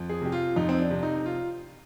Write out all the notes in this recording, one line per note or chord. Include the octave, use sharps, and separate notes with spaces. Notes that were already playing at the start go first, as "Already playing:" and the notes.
Already playing: F2
G#4
C3 G4
F4
F2 D#4
C4
D4
C3
D#4
F4